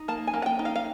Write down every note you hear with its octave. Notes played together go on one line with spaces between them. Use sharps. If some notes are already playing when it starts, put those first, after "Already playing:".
Already playing: D#4
A#3 A5
G#5
A#3
F#5
G5
D#4
F5
F5